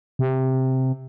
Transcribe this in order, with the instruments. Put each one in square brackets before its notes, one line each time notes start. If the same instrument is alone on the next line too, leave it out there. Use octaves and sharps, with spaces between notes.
[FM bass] C3